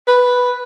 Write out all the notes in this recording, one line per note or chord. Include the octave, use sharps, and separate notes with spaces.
B4